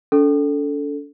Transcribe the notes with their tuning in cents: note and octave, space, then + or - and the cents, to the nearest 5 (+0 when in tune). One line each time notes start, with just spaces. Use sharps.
D4 -45 A4 +0